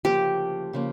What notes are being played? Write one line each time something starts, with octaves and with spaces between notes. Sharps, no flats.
D2 C#3 F3 A#3 G4
C#3 F3 A#3